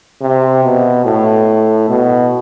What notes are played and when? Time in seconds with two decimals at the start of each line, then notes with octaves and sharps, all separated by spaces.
0.21 C3
0.63 B2
1.05 A2
1.89 B2